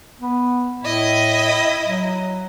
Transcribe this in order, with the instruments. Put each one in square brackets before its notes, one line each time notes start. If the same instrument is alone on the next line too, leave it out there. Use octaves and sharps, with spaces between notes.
[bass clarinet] B3
[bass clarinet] A2 [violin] E4 D#5
[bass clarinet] F#3